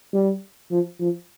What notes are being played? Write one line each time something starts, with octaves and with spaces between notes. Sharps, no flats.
G3
F3
F3